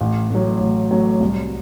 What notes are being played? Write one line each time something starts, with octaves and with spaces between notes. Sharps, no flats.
A1
A2 F#3
A1
A2 F#3
C2